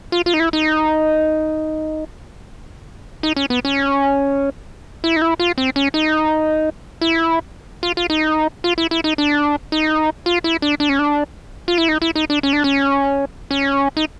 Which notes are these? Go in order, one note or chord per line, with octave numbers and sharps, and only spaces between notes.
F4
F4
D#4
E4
D#4
D#4
C#4
B3
C#4
E4
D#4
E4
F4
C4
C#4
D#4
E4
F4
F4
D#4
F4
E4
E4
D#4
D4
D#4
F4
E4
D4
D4
C#4
D4
F4
E4
D#4
E4
D#4
D4
C#4
D4
C#4
C#4
D#4